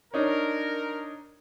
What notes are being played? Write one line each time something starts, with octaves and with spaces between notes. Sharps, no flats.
D4 D#4 A#4 C#5